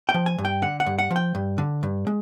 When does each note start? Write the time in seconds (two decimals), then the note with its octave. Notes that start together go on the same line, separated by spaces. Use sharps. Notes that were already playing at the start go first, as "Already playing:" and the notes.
0.09 G5
0.14 F3
0.26 G#5
0.38 G2
0.45 G5
0.62 D3 F#5
0.80 F#5
0.86 G2
0.99 F#5
1.11 F3
1.16 G5
1.35 G2
1.58 D3
1.83 G2
2.07 G#3